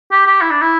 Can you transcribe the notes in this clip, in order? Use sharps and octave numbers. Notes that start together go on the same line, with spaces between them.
G4
G4
E4
D4
E4